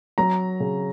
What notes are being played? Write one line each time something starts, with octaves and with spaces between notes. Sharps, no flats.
F#3 A#5
C#3